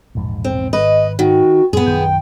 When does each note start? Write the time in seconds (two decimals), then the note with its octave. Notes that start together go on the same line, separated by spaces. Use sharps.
0.15 E1 A#1 G#2
0.44 C4
0.73 G#1 B4 D#5
1.19 D#3 F#4
1.73 F#2 A#2 B3 G#4
1.86 A#1 F#2 D#3 G5